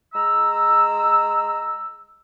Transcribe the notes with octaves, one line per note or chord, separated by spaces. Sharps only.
G#3 A#5 E6